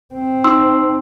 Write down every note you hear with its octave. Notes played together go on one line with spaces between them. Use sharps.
C4
D#4 C6 E6